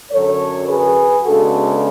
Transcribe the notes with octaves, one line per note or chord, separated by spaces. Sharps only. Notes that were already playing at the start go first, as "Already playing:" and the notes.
F#2 D3 F#3 A4 C#5
G#4 B4
C#3 G#3 B3 D4 F#4 A4